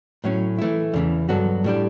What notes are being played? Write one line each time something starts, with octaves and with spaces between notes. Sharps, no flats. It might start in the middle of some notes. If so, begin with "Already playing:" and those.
A2 F#3 C#4
E3 A3 E4
E2 C#3 E3
G2 F#3 B3 F#4 A4
A2 G3 D4 G4